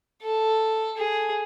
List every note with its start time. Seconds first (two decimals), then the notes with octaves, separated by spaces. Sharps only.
0.22 A4
0.97 G#4